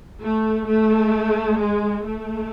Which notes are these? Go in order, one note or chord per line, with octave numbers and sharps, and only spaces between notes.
A3
A3
G#3
A3